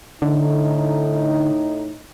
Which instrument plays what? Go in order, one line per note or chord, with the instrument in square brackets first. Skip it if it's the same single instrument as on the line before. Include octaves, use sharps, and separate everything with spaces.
[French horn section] A2 D#4 [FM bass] D3